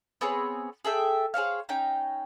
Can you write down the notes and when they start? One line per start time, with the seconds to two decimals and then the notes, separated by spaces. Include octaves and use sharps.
0.21 B3 C4 G#4 C#5
0.84 G#4 A4 E5 G5
1.34 G#4 C5 C#5 F5
1.69 C#4 D#4 G5